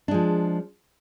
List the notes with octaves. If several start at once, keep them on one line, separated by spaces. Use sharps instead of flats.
F3 G#3 D4